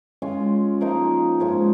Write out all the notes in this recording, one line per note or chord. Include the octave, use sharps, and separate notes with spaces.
G#3 C#4 F4
F3 A#3 D#4 A#4
G#2 F3 C#4